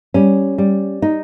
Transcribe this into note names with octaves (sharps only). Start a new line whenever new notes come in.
G3 C#4
G3
D#4